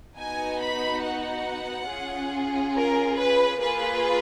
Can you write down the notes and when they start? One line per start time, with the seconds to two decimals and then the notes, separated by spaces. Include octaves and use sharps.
0.17 B3 D#4 F#4 G#5
0.60 B5
1.03 F#5
1.89 C#4 F4 G#4
2.74 A#4
3.17 B4
3.60 A#3 F4 G#4 B4